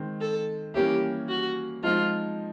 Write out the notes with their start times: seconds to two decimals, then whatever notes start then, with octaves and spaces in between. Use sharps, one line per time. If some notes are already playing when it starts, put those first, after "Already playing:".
Already playing: D#3 G#3 C4
0.21 A4
0.74 E3 G3 A#3 C#4 E4 G4
1.29 F#4
1.83 F3 G#3 C4 D#4 F4